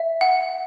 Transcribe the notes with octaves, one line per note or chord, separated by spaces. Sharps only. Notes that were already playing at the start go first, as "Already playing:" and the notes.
Already playing: E5
F#5